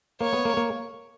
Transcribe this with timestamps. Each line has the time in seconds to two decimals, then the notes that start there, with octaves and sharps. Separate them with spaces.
0.21 A#3 C#5
0.33 B3
0.45 A#3
0.57 A#3